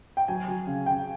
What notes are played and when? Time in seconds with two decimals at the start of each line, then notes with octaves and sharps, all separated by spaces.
0.17 G5
0.28 F#3 G#5
0.48 F#3
0.67 C#3
0.86 C#3 G5